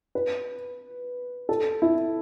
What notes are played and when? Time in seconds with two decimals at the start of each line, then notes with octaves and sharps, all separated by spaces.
0.15 B4
1.49 A4
1.82 E4